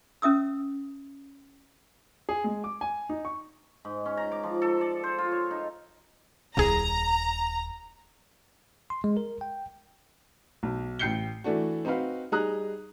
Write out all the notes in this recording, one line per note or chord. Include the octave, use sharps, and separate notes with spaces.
C#4 E5 D#6 E6
G#4
G#3
D6
G#5
D#4
C#6
G#2
C#4
A#5
D6
F3
A4
D5
C5
F4
C#5
D#4
D#1 C2 G#4 A#5
C6
G#3
A#4
G5
B1
A1 G5 G6 C7 C#7 G7
E3 A3 D4 F#4
C4 D#4 F#4 B4 F5
G3 D#4 G#4 A#5 D#6 F#6